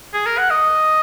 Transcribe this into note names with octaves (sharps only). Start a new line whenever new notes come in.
G#4
A#4
F#5
D#5